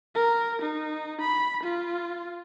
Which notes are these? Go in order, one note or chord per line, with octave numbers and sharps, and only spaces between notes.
A#4
D#4
B5
F4